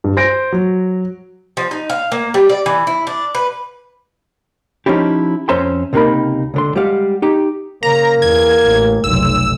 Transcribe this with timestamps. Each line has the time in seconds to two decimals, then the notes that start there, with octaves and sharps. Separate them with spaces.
0.04 G2
0.17 C5 A#6 D7
0.52 F#3
1.57 F3
1.71 D#4
1.90 F5
2.12 A#3
2.34 G3
2.49 D5
2.66 E3
2.87 E4
3.07 D4
3.35 B4
4.86 F3 C#4 D#4 E4 G4
5.49 F2 C#4 C5 E5 A#5 C6
5.93 C#2 C3 A#3 D#4 A#4 B5
6.54 C#2 D3 C6
6.75 G3 G#3 G4 F5 F#5
7.22 D#4 G4
7.83 C#3 A#3 A#5
8.22 E2 G#6
8.66 A1
9.04 F1 B1 E6